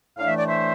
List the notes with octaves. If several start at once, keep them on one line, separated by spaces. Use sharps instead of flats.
A2 E3 A3 D4 F5
E5
D5
C5 E5